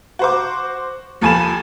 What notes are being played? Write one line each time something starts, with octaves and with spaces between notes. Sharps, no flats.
F#4 C5 D6
D#2 F3 A4 G#5 B5 E7